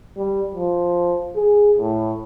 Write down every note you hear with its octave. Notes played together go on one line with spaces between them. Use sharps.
G3
F3
G#4
A2